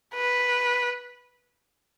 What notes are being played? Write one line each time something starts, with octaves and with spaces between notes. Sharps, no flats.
B4